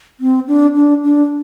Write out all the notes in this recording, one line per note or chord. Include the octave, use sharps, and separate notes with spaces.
C4
D4
D4
D4